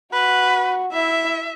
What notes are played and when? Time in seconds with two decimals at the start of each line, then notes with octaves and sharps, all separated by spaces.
0.13 F#4 B4
0.92 E4 E5